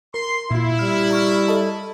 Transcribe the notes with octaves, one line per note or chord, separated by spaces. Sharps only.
A#4 C6
A#2 E4 F4
G3 F6
A#5 C#6 F6
A4 D#5 A5